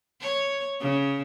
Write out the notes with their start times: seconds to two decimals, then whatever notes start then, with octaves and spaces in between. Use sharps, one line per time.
0.21 C#5
0.81 C#3